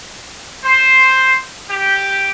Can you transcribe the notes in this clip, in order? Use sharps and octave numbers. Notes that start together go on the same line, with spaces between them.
C5
G4